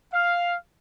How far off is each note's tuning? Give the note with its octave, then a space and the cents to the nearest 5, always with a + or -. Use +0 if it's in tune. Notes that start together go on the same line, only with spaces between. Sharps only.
F5 +0